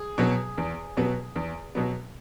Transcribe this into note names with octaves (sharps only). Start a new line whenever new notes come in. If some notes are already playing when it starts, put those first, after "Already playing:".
Already playing: G#4
B2 F#3 B3
E2
B2 F#3 B3
E2
B2 F#3 B3